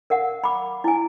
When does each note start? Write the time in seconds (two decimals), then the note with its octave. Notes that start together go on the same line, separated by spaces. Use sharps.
0.10 A#4 F5 F#5
0.44 B5 D6
0.84 E4 G#5